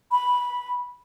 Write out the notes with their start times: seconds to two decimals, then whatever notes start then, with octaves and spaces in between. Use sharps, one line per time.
0.12 B5